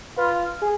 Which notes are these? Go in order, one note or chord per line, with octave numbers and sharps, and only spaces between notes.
F4 B4
G#4